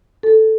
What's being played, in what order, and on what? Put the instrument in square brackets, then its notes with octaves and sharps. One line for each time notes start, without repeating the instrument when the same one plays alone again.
[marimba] A4